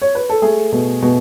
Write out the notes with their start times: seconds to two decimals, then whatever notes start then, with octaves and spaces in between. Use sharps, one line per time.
0.02 C#5
0.15 B4
0.30 A4
0.42 A3 G#4
0.72 B2
1.02 B2